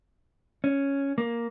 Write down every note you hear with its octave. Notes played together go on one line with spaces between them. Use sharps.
C#4
A#3